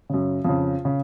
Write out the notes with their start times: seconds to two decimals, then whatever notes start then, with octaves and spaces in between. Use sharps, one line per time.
0.09 F#2 C#3
0.44 F2 C#3 F4
0.85 C#3